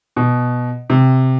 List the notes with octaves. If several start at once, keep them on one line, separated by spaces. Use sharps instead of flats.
B2
C3